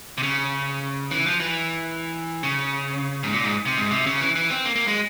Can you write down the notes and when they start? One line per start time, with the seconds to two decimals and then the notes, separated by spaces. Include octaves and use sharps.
0.18 C3
0.23 C#3
1.11 E3
1.26 F3
1.40 E3
2.43 C#3
3.23 G#2
3.32 A#2
3.44 G#2
3.65 C3
3.77 G#2
3.91 C3
4.06 C#3
4.21 E3
4.35 E3
4.50 C4
4.65 A#3
4.76 A#3
4.88 G#3